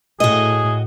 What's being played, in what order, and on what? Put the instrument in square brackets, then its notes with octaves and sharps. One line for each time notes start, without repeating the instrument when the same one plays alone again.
[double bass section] A2 [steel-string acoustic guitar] F#4 D#5 [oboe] G#4